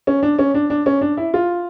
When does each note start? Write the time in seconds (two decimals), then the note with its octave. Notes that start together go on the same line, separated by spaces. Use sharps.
0.07 C#4
0.23 D4
0.39 C#4
0.54 D4
0.70 D4
0.86 C#4
1.01 D4
1.17 E4
1.34 F4